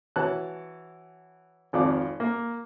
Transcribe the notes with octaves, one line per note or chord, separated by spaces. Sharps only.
E3 F#4 C#5 A5 F#6
G#1 F2 D5 F5 D6
A#3